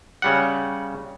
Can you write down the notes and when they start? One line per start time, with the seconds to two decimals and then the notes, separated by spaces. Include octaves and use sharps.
0.22 C#3 G3 F#5